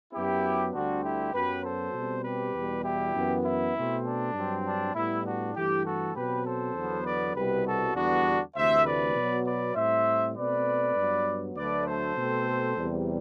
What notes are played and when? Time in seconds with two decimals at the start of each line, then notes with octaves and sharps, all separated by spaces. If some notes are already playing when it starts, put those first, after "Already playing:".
0.13 F#2 F#3 B3 E4 G4
0.73 D2 D3 G3 C4 D4 F#4
1.03 E4 G4
1.34 F#2 F#3 B3 G4 B4
1.64 A4 C5
1.94 B2 G3 C4
2.24 G4 B4
2.54 E2 B2 G3
2.84 E4 G4
3.14 F#2 E3 B3
3.45 E4
3.74 B2 A3 C4
4.05 D4
4.35 G2 F#3 C4
4.65 D4
4.95 A2 G3 B3 E4
5.25 D4 F#4
5.55 G2 E3 A3 E4 G4
5.85 F#4 A4
6.15 B2 F#3 C4 G4 B4
6.46 A4 C5
6.75 E2 D3 F#3 B3
7.05 B4 D5
7.35 C2 B2 G3 B3 G4 B4
7.65 F#4 A4
7.96 E2 D3 G3 B3 D4 F#4
8.56 D2 C3 E3 A3 C5 E5
8.85 B4 D5
9.16 B2 F#3 B3
9.46 B4 D5
9.76 A2 G3 C4 C5 E5
10.36 B2 A3 C4 B4 D5
10.96 G2 F#3 B3
11.56 D2 D3 F#3 A3 B4 D5
11.87 A4 C5
12.18 B2 A3 C4
12.77 E2 C3 G3